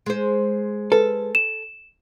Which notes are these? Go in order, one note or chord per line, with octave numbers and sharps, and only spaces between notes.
G#3 C5
A4 B4
E7